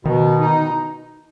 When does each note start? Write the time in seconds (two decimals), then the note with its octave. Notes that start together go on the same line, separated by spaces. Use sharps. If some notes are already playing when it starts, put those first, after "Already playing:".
0.05 B2 D#3
0.40 D#4